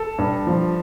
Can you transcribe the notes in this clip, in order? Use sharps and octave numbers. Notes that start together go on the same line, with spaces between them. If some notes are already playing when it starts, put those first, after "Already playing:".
Already playing: A4
G2
F3